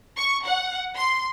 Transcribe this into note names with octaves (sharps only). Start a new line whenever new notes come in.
C#6
F#5
C6